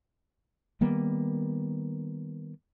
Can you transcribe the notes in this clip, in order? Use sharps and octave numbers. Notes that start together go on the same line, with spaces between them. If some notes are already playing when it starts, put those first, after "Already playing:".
D#3 G3 A#3 B3